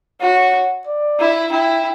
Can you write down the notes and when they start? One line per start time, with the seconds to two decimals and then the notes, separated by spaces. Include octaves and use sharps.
0.21 F#4 C#5
0.87 D5
1.19 E4
1.52 E4 G5